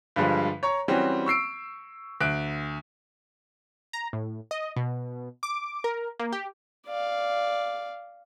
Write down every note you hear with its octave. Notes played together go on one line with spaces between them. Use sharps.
G2 D3 F3 G3 G#3
C#5 A#5 C#6
E3 G3 C4 C#4 F#4
C#6 E6 C7 D7
D2 F#6 D7
A#5
A2
D#5
B2
D6
A#4
A#3
G4
D5 F5